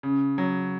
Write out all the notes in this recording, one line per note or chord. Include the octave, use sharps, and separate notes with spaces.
C#3
F#3